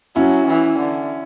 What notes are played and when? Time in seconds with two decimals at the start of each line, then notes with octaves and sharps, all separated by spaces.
0.16 F#3 C#4 E4
0.47 E3
0.79 D3